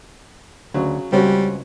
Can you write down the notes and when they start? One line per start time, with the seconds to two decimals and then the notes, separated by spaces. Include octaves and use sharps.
0.74 D2 C#3 F#3
1.12 C#2 G3 C4 C#4 F#4